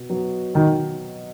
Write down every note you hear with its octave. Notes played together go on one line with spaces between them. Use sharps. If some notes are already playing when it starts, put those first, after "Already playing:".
Already playing: B2
F#3 B3
B2 D#3